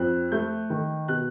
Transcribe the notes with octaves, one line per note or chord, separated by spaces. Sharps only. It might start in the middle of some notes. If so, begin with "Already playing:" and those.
Already playing: F2 F#6
A3 G6
D#3
B2 F#6